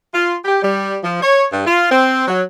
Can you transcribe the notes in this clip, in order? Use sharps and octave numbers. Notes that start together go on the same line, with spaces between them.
F4
G4
G3
F3
C#5
G2
F4
C4
F#3